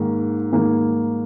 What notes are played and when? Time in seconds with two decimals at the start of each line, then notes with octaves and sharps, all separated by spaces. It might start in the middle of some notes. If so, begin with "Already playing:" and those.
Already playing: G#2 D#3 A#3
0.52 G#2 D#3 A#3